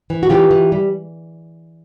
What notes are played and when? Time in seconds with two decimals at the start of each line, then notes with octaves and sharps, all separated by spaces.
0.10 E3
0.23 F#4
0.30 E3 F4 G4
0.51 E3
0.72 G3